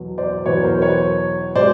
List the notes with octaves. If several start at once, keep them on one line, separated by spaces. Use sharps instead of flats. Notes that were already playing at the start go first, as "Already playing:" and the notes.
Already playing: E2 B2 F#3
C5 D5
E2 B2 F#3 B3 B4 C#5
A#4 C5
B4 C#5
B2 G#3 C5 D5